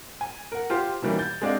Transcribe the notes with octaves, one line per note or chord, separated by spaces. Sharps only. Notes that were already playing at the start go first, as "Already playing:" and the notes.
G#5
A#4 F#5
F4 G4 C5 C6
B2 D#3 E3 G3 A#3 C#4
G6 A6
G#3 C4 D4 D5 D#5 F5